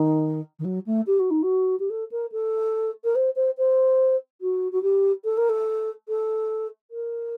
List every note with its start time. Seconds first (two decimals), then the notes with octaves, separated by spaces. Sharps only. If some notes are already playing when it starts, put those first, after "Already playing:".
Already playing: D#3
0.59 D#3
0.65 F#3
0.86 A3
1.07 G4
1.19 F#4
1.31 D#4
1.43 F#4
1.80 G4
1.90 A4
2.12 A#4
2.32 A4
3.04 A#4
3.15 C5
3.36 C5
3.58 C5
4.41 F#4
4.72 F#4
4.83 G4
5.25 A4
5.38 A#4
5.49 A4
6.09 A4
6.91 A#4